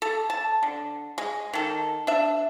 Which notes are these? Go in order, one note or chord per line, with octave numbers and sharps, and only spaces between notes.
A4
A5
D3
G#3
D#3 A4
D4 E5